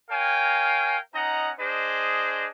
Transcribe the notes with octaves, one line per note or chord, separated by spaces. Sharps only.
A#4 C#5 F5 G5 G#5
C#4 D#4 D#5 F#5 A#5
D4 G#4 C5 D#5